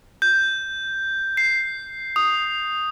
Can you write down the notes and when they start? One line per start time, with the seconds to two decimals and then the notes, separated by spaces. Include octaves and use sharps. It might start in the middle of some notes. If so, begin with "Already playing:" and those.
0.22 G6
1.37 C7
2.16 D#6